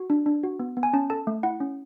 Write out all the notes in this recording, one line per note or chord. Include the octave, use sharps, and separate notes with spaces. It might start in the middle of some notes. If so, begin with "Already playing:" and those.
Already playing: F#4
D4
D4
F#4
B3
B3
G#5
C#4 A5
A4 A5
A3
E4 F#5
C#4